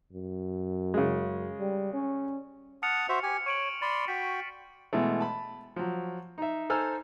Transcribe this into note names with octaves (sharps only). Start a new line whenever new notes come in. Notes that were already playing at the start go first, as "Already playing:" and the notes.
F#2
C#3 G#3
G3
C#4
F#5 A5 D#6 F6 C#7 F7
F#4 C5 E5
G4 G#5
C#5 C#6 D7 F#7
D5 B5 C6 A6
F#4 G5 B6
B2 E3 G#3 A3
A5 B5
F3 F#3
D#4 E5
D#4 A4 C5 G#5 E6 F6